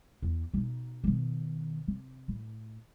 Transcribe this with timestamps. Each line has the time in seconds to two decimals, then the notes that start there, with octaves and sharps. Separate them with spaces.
0.22 E2
0.54 B2 D#4
1.04 B2 D#3
1.88 C3
2.28 A2